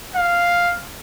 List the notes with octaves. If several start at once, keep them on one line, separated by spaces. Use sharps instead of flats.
F5